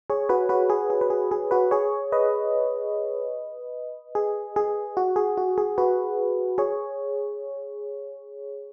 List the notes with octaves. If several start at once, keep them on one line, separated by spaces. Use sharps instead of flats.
G#4 C#5
F#4 B4
F#4 B4
G#4
G#4
B4
G#4
G#4
F#4 B4
G#4 C#5
B4 D#5
G#4
G#4
F#4
G#4
F#4
G#4
F#4 B4
G#4 C#5